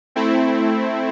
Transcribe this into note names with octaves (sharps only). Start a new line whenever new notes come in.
A3 C4 E4